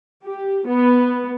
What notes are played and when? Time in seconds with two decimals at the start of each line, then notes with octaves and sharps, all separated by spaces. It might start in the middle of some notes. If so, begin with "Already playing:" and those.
0.24 G4
0.68 B3